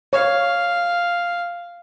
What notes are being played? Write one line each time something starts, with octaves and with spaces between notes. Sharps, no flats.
C#5 F5